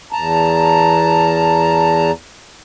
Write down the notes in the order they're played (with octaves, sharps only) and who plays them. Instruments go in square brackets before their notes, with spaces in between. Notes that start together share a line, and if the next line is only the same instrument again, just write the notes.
[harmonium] E2 A5 A#5